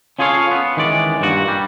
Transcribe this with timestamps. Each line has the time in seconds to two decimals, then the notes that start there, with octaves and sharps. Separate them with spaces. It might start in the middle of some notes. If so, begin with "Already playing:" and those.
0.19 C#4 F4 G#4 A4 C#5 F5
0.51 B3
0.77 D#3 E3 G#3 C#4 D5
1.21 G2 A#2 F#4
1.48 G3